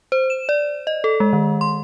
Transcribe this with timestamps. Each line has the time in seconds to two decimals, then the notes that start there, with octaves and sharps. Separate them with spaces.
0.12 C5
0.30 E7
0.49 D5
0.87 D#5
1.04 A4
1.20 G#3
1.33 D#3
1.61 C6